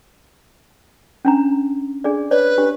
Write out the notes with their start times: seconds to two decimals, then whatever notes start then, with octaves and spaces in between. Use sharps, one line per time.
1.25 C#4 D4 A#5
2.04 D4 G#4 D5
2.31 B4 C#5 D5
2.58 D4 G4